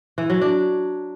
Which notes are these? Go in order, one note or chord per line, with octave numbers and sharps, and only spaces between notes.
E3
F#3
D4